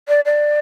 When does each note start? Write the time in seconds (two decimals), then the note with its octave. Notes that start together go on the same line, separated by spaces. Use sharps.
0.08 D5
0.25 D5